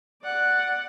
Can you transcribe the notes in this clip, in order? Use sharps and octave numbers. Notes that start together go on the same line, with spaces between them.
D5 F#5